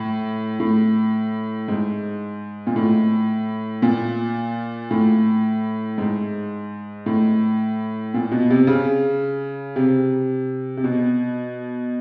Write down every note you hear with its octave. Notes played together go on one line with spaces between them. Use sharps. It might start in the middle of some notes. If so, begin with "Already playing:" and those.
Already playing: A2
A2
G#2
A#2
A2
A#2
A2
G#2
A2
A#2
B2
C3
C#3
C3
C3
B2